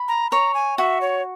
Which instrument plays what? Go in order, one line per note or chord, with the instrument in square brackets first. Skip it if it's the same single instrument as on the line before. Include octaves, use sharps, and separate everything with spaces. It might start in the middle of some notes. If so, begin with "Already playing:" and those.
Already playing: [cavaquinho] B5
[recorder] A#5
[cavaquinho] C#5 [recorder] A#5
[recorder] G#5
[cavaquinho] F#4 [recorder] E5
[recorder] C#5